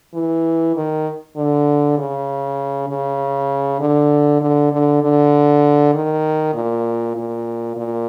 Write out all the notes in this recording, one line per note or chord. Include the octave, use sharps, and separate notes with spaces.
E3
D#3
D3
C#3
C#3
D3
D3
D3
D3
D#3
A#2
A#2
A#2